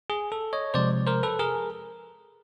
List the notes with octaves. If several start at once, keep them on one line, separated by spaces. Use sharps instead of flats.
G#4
A4
C#5 D#5
C3 F3 G#3 C5 D5
A#4 C5
A4 B4
G#4 A#4